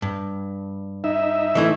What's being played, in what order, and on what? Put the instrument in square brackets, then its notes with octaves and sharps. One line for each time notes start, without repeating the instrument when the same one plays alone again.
[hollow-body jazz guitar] G2
[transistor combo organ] D#4 E5
[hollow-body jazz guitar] E3 A3 E4